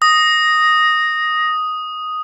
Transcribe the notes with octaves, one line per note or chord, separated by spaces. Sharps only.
D#6 A#6